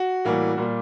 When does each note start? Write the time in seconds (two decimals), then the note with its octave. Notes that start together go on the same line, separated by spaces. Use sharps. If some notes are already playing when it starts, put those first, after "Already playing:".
Already playing: F#4
0.25 A2 E3 G3 A#3
0.57 A#2 G3 A#3